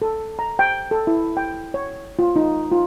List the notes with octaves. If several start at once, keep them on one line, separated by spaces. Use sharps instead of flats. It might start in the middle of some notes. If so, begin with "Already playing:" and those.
A4
A#5
G5
A4
E4
G5
C#5
F4
D#4
F4